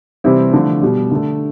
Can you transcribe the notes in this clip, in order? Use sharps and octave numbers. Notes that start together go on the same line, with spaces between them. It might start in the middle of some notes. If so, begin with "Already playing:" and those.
C3 E3 G3 C4 E4
D3 F3 A3
B2 G3
D3 A3